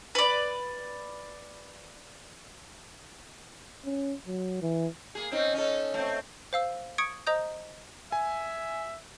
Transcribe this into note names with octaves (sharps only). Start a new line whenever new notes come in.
B4 D5
C#4
F#3
E3
A#3 G#4
C4 C#4 D#4
C#4 D#4 A4
A3 C4
C5 F5 E6
C#6 D#6 G#6 C#7 D7
C5 D#5 A#5 D#6 G6
E5 G#5